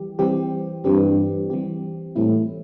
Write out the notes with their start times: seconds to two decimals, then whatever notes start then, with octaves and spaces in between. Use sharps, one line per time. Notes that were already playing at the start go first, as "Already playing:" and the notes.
Already playing: E3 G3 G4
0.19 E3 G3 C4 G4
0.85 G2 E3 G3 C4 G4
1.50 E3 G3 C4 G4
2.16 A2 E3 G3 C4 E4